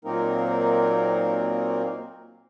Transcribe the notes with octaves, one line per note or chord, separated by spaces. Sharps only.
A#2 F#3 A#3 C4 D#4 A#4